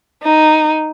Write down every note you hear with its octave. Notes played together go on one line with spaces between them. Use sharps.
D#4